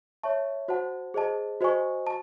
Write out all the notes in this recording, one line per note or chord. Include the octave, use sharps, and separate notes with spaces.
C#5 E5 A5 C#6
F#4 C5 F#5 A5
G#4 C5 D#5 A5
F#4 C5 D#5 G#5 C#6
A5